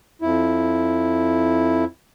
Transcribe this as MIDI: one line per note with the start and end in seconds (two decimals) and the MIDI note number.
0.22 1.85 41
0.22 1.85 64